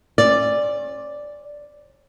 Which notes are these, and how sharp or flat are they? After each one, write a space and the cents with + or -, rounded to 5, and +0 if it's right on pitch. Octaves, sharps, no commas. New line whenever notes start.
C#4 -35 D5 +0